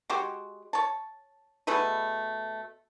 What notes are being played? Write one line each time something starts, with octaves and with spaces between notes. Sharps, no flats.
G#3 F#4 G4
C#5 A5
B2 A3 G#4 B4